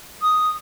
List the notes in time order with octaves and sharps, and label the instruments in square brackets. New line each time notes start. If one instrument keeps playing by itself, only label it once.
[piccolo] D#6